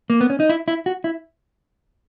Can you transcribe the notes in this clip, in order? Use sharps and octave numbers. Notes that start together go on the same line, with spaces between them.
A#3
B3
C#4
D#4
E4
E4
F#4
E4